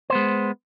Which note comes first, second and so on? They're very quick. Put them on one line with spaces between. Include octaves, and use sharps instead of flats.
C5 B3 G#3